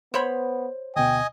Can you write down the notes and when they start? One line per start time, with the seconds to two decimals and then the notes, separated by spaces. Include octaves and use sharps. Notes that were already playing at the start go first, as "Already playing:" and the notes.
0.14 B3 C5 C#5 B5
0.96 D2 B2 D#5 G5 G#5 D#6